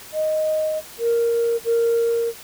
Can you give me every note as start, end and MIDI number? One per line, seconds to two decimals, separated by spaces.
0.14 0.78 75
0.99 1.56 70
1.65 2.28 70